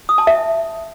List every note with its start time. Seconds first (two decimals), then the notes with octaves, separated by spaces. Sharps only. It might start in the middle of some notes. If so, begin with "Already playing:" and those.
0.09 D#6
0.18 A5
0.27 E5